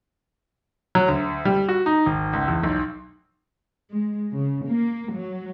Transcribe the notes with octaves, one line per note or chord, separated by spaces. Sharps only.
F#3
D2
G3
F#4
D#4
G#1
C#2
E2
B1
G#3
C#3
A#3
F#3